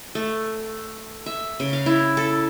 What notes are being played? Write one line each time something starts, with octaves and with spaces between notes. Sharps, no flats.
A3
E5
C#3
F5
E4
A4